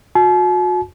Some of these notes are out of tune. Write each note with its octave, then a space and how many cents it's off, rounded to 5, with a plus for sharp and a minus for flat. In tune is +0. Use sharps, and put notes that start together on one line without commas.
F#4 -35 A5 -45